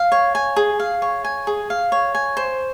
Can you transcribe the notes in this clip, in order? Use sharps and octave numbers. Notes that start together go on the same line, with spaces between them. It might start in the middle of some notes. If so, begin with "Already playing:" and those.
Already playing: F5
C#5
G#5
G#4
F5
C#5
G#5
G#4
F5
C#5
G#5
C5